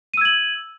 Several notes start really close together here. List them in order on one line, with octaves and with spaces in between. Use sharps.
D#7 E6 G#6 F#7